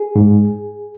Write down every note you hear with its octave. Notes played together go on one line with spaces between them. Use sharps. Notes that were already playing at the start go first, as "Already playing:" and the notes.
Already playing: G#4
G#2